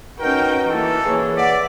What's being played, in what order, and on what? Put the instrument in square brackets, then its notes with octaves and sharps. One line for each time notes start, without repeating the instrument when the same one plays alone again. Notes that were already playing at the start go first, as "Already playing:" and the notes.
[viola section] C#4 G5 [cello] D#4 F#4 [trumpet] A#4 [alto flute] B4
[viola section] E3 A#3 [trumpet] A4
[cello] G#4 C#5 [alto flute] B4
[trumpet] D5 [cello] E5 [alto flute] F#5